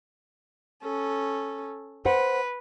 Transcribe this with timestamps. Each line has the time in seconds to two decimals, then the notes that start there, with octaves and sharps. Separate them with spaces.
0.83 C#4 A4
2.06 B4 C5 F#5